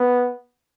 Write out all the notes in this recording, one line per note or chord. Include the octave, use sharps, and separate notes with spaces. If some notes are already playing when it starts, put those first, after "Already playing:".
Already playing: B3